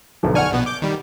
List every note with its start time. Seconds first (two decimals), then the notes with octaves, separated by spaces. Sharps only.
0.23 B1 D3 F3
0.35 D5 F#5 G#5 C#6 F6
0.51 A#1 B2 B3
0.66 D6 G6
0.82 D#3 G3